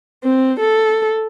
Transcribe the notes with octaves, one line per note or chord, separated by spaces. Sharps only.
C4
A4